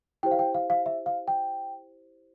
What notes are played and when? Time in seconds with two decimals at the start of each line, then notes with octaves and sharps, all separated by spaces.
0.23 E4 G4 C5 G5
0.31 F5
0.39 G5
0.55 F5
0.70 F5
0.86 E5
1.06 F5
1.28 G5